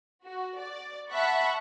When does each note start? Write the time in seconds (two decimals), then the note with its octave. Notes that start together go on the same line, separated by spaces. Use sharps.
0.25 F#4
0.58 D5
1.11 E5 F#5 A5 B5 C#6 F#6